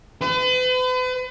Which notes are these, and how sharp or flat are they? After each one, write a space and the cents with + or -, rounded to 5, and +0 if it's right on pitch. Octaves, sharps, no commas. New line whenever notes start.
B4 +40